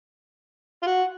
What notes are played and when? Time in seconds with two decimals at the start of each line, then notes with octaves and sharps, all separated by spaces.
0.83 F4
0.87 F#4